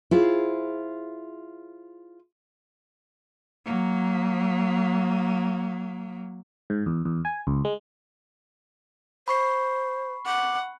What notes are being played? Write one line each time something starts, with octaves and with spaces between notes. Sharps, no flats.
E4 F4 G#4 C5
F#3 A#3
G#2
E2
E2
G#5
C#2
G#3
C5 B5 C#6 C7
F#5 D6